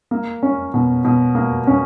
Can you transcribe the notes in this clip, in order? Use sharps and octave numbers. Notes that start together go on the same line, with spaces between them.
A#3
C#4
B2
B2
A#3
C#4